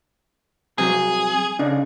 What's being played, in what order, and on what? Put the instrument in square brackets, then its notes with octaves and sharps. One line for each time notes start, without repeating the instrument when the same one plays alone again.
[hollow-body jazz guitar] C2 C3 F#3 [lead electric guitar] G#4
[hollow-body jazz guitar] C#3 D4 D#4